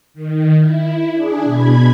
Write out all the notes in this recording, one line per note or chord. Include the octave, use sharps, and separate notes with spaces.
D#3
E4
D4 G#4
B2 B5 G#6